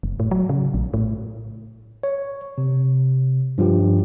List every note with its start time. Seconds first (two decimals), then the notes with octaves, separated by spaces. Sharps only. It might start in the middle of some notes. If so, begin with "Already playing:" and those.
0.03 F#1
0.20 A2
0.31 F#3
0.49 C#3
0.74 A#1
0.94 A2
2.03 C#5
2.58 C3
3.58 G2 F3 F4 G4